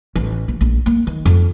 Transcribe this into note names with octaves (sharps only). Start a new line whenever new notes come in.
A1
A#1
A#1
A#3
D#3
F2